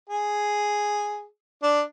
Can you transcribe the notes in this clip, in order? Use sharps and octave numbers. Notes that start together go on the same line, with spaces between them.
G#4
D4